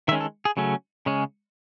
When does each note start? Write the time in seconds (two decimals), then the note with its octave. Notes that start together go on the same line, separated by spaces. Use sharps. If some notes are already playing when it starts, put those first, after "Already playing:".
0.08 D#3 E5
0.11 G#3 C#4
0.20 A4
0.45 G#4
0.57 C#3 F#3 A3 C#4
1.06 C#3 G#3 C#4